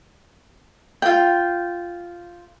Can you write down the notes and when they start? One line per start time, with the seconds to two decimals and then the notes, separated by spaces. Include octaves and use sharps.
1.02 F4 G5